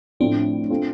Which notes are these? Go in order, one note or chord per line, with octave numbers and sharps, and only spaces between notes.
A2 F3 A3 C4 D4
C4 F4 A4 C5